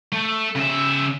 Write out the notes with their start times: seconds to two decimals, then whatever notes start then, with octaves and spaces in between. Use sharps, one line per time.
0.12 A3
0.55 C#3 E5